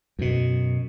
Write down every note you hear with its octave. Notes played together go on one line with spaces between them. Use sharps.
F#2 B2